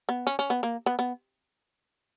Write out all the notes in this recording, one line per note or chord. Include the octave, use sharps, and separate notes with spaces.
B3
C#4
C#4
B3
A#3
B3
B3